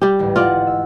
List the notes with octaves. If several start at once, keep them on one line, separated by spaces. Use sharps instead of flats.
G3 G4
A1 D2 G#2
F4 D5 D#5 F#5
E6